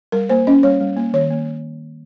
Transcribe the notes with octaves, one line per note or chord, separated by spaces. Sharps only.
G3 A#4
A#3 C5
C#4 D#5
G3 C#5
G3
A#3
D#3 C#5
A#3